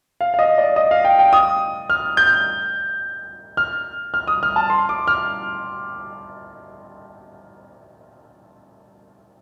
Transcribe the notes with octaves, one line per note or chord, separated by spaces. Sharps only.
F5
F5
D#5
D5
D#5
F5
G5
G5
D#6
F6
G6
F6
F6
D#6
F6
A5
C6
D6
F6